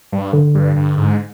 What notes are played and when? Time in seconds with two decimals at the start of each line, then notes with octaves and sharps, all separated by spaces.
0.12 G2
0.33 D3
0.55 G2
0.76 G2
0.97 G#2